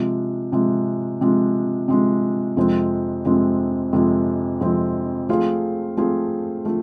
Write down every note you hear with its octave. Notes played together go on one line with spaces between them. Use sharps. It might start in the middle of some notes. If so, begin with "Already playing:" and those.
Already playing: C3 F3 G#3
C3 F3 G#3
C3 F3 G#3
C3 F3 G#3
F2 C3 F3 G#3 C4
F2 C3 F3 G#3 C4
F2 C3 F3 G#3 C4
F2 C3 F3 G#3 C4
F3 A3 C4 F4 G#4
F3 A3 C4 F4 G#4
F3 A3